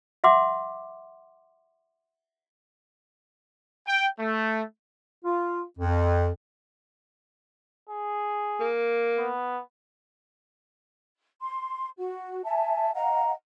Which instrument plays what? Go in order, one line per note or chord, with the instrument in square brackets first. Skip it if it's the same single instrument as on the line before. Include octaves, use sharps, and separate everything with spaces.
[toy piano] E5 F#5 C6 D6
[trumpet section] G5
A3
[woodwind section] F4
F2
[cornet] G#4
[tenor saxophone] A#3
[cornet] B3
[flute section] C6
F#4
E5 G#5 A5
D#5 F5 F#5 A#5